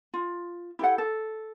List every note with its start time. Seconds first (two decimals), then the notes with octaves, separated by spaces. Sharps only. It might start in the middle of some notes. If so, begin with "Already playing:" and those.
0.14 F4
0.79 E4 G4 A4 F#5
0.98 A4